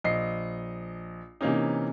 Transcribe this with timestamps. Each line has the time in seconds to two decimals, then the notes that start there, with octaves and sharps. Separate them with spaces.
0.04 A#1 D#5 C7
1.41 C3 E3 A#3 C#4 D#4